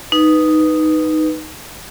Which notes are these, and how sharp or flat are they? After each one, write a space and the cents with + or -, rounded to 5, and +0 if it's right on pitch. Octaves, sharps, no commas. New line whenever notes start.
D#4 +0 B4 +0